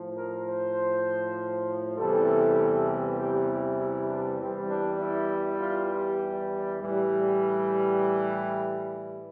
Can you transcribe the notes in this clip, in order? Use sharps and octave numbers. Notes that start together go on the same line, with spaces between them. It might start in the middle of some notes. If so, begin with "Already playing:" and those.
Already playing: A2 F3
A#4
C5
E2 C3 E3 G3 A4
G4
E4
D4
E2 E3 G3 C4
D4
E4
F4
G4
A2 E3 G3